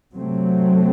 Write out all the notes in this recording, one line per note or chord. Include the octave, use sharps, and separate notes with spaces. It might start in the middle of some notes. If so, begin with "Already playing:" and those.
C3 F#3 A3 C4